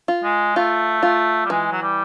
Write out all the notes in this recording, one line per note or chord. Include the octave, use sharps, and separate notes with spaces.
F4
G#3
A3 F4
A3 F4
G3
E3 G#3
F#3
G3